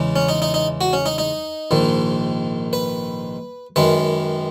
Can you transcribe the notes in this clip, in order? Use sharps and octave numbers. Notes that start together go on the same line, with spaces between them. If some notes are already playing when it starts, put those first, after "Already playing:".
Already playing: E2 C#3 G#3
C#4
D#4
D#4
D#4
F#4
C#4
D#4
D#4
A#1 G#2 D#3
B4
F#2 D#3 G#3 B4